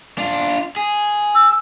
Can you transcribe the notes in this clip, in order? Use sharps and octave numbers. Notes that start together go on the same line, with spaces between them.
D4 F4
G#4
E6